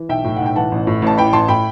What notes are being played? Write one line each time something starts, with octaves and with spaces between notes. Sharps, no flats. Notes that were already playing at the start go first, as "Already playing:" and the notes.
Already playing: E3
B1 E5 G5
A2
B1 F#5
G5
E3 F#5 A5
A1
A2
A1 A5
E3 G5 B5
A1 A5 C6
A2 G5 B5